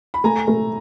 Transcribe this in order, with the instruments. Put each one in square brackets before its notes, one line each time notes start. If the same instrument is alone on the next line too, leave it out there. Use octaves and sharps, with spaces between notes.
[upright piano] B5
[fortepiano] A3 [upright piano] G#5 A#5
[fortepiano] A3